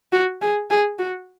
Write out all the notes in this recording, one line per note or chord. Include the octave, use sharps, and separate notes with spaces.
F#4
G#4
G#4
F#4